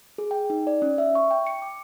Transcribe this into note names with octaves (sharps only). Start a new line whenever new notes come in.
G#4
G5
D#4
D5
C#4
E5
C#6
G5
C#7
D6